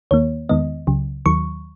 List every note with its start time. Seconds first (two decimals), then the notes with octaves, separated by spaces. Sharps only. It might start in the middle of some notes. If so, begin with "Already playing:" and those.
0.11 D#2 D#3 A#3 C#5
0.49 E2 D#3 G#3 B3 D#5
0.87 C#2 C#3 F#3
1.26 D#2 D#3 F#3 C#6